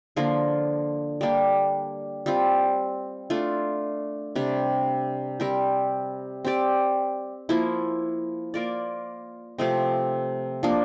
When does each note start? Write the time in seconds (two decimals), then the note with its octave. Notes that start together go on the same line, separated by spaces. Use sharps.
0.16 D3 F3 A#3 F4
1.21 G3 A#3 D4 G4
2.26 G3 C4 F4
3.30 A3 D4 F4
4.36 C3 G3 D4
5.40 G3 C4 G4 A#4
6.45 C4 G4 D5
7.49 F3 A#3 E4
8.54 A#3 F4 A#4 D5
9.58 C3 F3 A3 C4
10.63 F3 A#3 D4